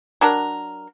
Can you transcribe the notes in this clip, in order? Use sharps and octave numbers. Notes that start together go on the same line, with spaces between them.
F#3 D4 A#4